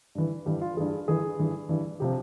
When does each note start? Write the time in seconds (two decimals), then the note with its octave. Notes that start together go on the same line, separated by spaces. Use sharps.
0.15 G2 E3
0.46 G2 E3 G4
0.61 F4
0.77 G2 E3 G#4
1.08 G2 E3 G#4
1.39 G2 E3
1.69 G2 E3
2.00 C3 F3 G4